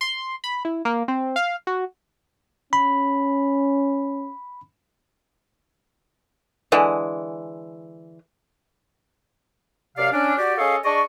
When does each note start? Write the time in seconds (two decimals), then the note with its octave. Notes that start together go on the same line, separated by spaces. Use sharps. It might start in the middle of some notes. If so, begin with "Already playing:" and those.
0.01 C6
0.44 B5
0.65 E4
0.85 A#3
1.08 C4
1.36 F5
1.67 F#4
2.73 C#4 B5
6.72 D3 E3 G#3
9.97 F#2 C3 D5 F5
10.13 C#4 D4
10.38 F#4 G4 D5
10.58 C#4 G#4 A4 C#5 D#5 F5
10.84 D4 G#4 D5 D#5 C#6